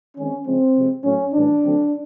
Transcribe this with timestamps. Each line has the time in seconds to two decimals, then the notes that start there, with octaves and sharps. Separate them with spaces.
0.17 D#3 G#3 C4 C#4
0.46 C#3 F3 G#3 C4
0.76 C3 F3 G#3
1.04 A2 F#3 A3 C#4
1.34 A2 E3 G3 D4
1.63 D3 F#3 A3 C4